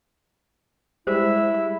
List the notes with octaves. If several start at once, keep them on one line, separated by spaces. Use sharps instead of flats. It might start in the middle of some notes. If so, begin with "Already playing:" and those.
G3 G#3 E4 C5 E5